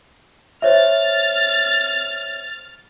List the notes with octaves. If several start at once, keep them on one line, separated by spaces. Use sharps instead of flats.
C5 C#5 E5 F6 A6